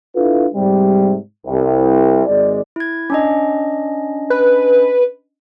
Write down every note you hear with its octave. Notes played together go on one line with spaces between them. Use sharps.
D4 E4 F4 A4 B4
G#2 C3 G3
C2
G#1 G#3 D5
E4 G#6
C#4 D4 D#5
B4